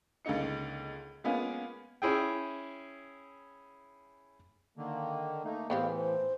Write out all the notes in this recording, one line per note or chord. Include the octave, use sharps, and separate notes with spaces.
C#2 D3 A#3 D#4 C#7
G#3 A#3 B3 C#4 F4 G#4
C#4 E4 G#4 G5
D3 D#3 A#3
A3 A#3 D#4
A2 E3 B3 C4 G4 F5
C5